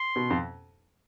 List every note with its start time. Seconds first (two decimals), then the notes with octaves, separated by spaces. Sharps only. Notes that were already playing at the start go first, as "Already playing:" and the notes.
Already playing: C6
0.16 B2
0.30 F2